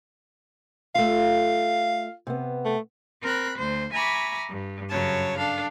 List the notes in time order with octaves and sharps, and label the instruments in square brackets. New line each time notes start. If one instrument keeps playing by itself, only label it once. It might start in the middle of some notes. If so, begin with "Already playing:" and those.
[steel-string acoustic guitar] A3 F4 [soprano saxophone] F5
[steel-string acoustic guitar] C3 B3
[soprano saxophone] A3
[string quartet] C4 A#4 B5 F#6
D2 C5
E5 G#5 A#5 B5 C#6 D6
G2
F#2 C#3 F#3 C#5 A5
D4 A4 F5